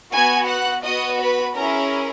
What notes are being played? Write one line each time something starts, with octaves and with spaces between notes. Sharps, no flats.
B3 F#4 G#5 G#6
F#5 F#6
B3 F#4 D#5 D#6
B4 B5
C#4 E4 G#4 A#4 A#5